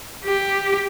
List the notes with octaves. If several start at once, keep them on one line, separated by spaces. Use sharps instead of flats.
G4